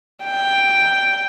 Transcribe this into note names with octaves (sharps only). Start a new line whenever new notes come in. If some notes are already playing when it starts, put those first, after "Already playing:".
G5